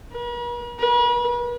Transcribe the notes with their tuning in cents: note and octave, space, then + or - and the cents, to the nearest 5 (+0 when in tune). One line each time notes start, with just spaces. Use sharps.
B4 -45
B4 -40